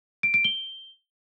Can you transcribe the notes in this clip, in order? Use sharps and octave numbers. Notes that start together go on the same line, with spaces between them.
D7
D7
G7